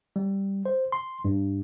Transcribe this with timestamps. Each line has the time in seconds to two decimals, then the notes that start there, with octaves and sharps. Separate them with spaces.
0.16 G3
0.65 C5
0.92 C6
1.25 G2